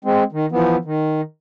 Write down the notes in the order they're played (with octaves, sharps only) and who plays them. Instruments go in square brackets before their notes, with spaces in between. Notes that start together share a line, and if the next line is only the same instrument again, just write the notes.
[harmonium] G#3 C4
D#3
E3 F3 B3
D#3